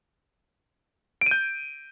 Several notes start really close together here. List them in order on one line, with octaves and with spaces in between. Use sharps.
D7 D#7 G6